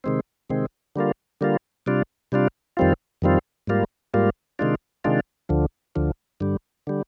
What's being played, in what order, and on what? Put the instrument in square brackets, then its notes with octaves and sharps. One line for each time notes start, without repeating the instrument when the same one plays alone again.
[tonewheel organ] C3 D#3 G#3 C4
C3 D#3 G#3 C4
D3 G3 A#3 F4
D3 G3 A#3 F4
C3 G3 D4 F4
C3 G3 D4 F4
F2 D#3 G3 C4 F4
F2 D#3 G3 C4 F4
G#2 G3 A#3 F4
G#2 G3 A#3 F4
C3 D#3 G#3 D4 F4
C3 D#3 G#3 D4 F4
D2 D3 F3
D2 D3 F3
G2 D3 G3
D3 G3